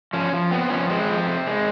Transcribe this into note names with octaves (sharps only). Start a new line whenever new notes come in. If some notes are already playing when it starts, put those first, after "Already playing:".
F3 C#4
F3
B3 C4
F3 C#4
G#3 C4
F3
C3
G#3